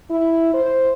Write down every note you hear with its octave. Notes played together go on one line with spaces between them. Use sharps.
E4
C5